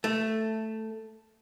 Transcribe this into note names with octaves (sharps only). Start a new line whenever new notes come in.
A3